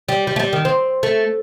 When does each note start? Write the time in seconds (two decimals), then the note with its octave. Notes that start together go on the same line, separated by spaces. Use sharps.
0.09 G3
0.27 G3
0.36 A3
0.40 G3
0.53 D#3
0.65 C4
1.03 A3